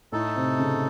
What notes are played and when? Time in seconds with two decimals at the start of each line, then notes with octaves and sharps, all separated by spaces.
0.12 A2 A3 D#4 A4
0.36 C3
0.59 C#3